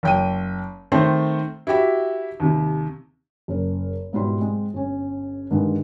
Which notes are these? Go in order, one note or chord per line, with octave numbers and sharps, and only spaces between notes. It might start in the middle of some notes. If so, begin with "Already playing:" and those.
F#1 G5 D#7
D#3 A3 C4 C5
E4 F#4 G4 E5
D#2 C3
F#1 A#4
G#2 B2 G3 E4 D5 C6
G#3 C4
G1 C#4
G2 D3 D#3 G#3